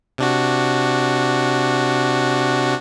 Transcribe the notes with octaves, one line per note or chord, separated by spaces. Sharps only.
C3 D4 F#4